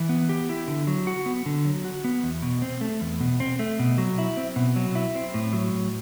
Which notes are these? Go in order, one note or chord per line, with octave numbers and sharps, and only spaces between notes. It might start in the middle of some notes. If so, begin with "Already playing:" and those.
Already playing: E3
B3
G4
E4
D3
F#3
F#4
B3
D3
F#3
F#4
B3
E2
B2
C4
A3
E2
B2
C4
A3
B2
F#3
E4
C4
B2
F#3
E4
C4
A2
F#3
A2